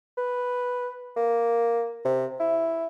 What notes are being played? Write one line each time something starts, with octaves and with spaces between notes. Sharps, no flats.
B4
A#3
C3
E4